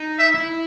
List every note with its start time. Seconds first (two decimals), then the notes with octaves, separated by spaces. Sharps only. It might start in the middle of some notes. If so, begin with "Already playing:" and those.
Already playing: D#4
0.19 E5
0.35 E4